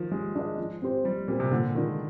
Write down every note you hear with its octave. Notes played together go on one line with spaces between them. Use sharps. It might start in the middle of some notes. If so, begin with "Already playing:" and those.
Already playing: D#3 F3
G3 G#3
D4 G#4 D#5
F3
C4 G4 C5
F3 G3
A#2 C4 G4 C5
C3
A#2 D3
D#3 G#3 D4 F4